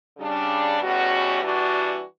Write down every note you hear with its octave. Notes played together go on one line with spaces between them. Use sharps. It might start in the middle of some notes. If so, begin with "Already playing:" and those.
C#3 G3 D4
E2 B2 G3 C#4 F#4
E3 G3 D4 F#4